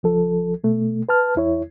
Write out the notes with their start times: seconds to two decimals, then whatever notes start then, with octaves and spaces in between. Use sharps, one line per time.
0.03 C#2 F3 A4
0.64 B2 A3
1.09 B4 A5 F6
1.36 E2 E4 C#5